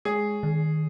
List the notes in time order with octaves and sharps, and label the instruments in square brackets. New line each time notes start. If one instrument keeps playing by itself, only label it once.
[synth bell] G#3 [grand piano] G#4
[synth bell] D#3